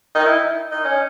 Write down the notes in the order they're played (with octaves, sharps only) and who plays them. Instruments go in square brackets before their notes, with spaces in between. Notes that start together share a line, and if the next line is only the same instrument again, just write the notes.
[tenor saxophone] D#4
E4
D#4
C#4